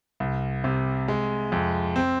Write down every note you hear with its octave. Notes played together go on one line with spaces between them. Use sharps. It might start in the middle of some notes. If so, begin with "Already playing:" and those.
C2
C3
G#3
F2
C4